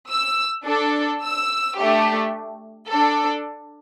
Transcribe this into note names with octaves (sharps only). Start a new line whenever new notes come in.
E6
D4 A4
E6
A3 D4 G4
D4 A4